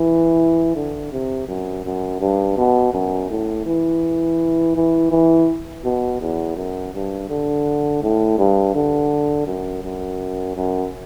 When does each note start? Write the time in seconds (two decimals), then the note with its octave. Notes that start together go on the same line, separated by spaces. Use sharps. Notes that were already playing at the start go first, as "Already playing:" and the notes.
Already playing: E3
0.76 D3
1.12 C3
1.48 F#2
1.85 F#2
2.20 G2
2.57 B2
2.93 F#2
3.30 A2
3.66 E3
4.76 E3
5.11 E3
5.84 B2
6.20 E2
6.56 F#2
6.94 G2
7.29 D3
8.02 A2
8.38 G2
8.75 D3
9.47 F#2
9.83 F#2
10.56 F#2